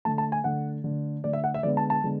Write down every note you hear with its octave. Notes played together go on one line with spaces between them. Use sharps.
D3 A3 A5
A5
G#5
D3 A3 F#5
D3 A3
D3 A3 D5
E5
F#5
E5
D3 G#3 B3 D5
A5
A5
D3 G#3 B3